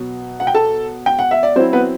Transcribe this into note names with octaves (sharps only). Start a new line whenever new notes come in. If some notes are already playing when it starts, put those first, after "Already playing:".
Already playing: B2 F#3 B3
F#5
G5
A4 A5
G5
F#5
E5
D5
F#3 C4 E4 C5
B3 B4